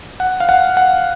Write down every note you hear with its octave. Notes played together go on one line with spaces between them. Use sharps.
F#5
F5
F#5
F#5